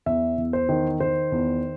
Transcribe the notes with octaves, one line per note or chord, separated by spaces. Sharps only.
E2 E5
E2
C5
D#3
D#3 C5
E2